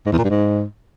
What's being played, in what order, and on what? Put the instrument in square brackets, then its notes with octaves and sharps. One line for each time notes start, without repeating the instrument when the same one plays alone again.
[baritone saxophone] G#2
E2
A#2
G2
G#2